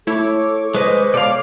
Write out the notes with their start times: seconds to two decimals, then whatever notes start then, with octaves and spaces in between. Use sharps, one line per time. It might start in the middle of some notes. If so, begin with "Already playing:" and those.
0.07 A3 E4 A4 C#5 D6
0.75 G#3 B4 C5 D#5
1.14 B2 A4 D5 F5 C6